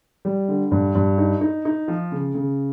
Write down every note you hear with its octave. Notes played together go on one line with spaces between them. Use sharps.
G3
D3
G2
G2
D#4
D#4
D#4
F3
C#3
C#3